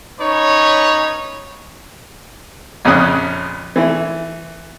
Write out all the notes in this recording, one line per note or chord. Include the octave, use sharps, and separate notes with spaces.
C#4 D#4 B4 C#5
A#1 F2 C#3 C#4 D#6 F#6
E3 A3